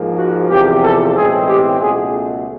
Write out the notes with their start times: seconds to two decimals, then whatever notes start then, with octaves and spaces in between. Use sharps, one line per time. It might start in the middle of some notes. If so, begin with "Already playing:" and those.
Already playing: G#2 F3 A#3
0.18 F#4
0.50 E2 C3 F3 G4
0.82 A4
1.15 B1 A2 E3 G#3 C4 G#4
1.47 G4
1.79 C#2 B2 F#3 A3 G#4